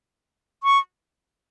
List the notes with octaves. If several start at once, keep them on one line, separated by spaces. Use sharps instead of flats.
C#6